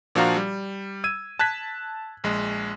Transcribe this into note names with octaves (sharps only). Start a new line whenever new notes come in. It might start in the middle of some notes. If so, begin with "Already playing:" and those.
A#2 F3 D4 F#4 F5 A#5
G3
E6 G#6 D#7
A5 F#6 G#6 B6
A#1 G#3